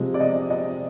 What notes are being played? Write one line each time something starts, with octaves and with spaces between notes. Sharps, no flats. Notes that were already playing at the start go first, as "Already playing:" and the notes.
Already playing: C3 F3 G#3
D5
D#5
D#5